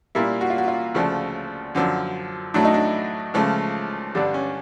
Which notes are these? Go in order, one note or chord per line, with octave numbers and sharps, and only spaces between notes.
A#2 G3 A#3 E4
F#4
F4
F#4
F4
D2 C#3 F3 A3
F#2 D3 F3
A2 F#3 A3 D4
D#4
D4
C#2 C#3 F3 A3
G2 D3 G3 D4
C#4